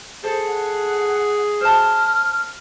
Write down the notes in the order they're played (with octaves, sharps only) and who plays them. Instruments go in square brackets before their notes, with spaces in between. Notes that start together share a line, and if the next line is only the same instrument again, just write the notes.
[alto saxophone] G#4 [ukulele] A4 C5
[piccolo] F#5
[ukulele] C5 A5 [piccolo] F6